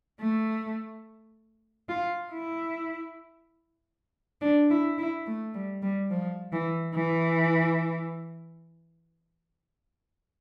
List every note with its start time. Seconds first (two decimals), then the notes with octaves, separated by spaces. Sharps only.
0.21 A3
1.89 F4
2.32 E4
4.42 D4
4.70 E4
4.98 E4
5.27 A3
5.55 G3
5.82 G3
6.11 F3
6.53 E3
6.95 E3